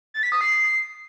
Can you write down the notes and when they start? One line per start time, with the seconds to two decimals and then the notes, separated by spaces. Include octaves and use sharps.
0.14 A6
0.23 B6
0.32 D#6
0.41 C7